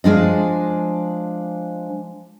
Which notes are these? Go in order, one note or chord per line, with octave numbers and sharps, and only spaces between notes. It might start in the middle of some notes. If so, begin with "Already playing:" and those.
F3 G#3 D4 D#5